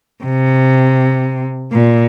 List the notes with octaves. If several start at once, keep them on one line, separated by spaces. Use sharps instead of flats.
C3
A#2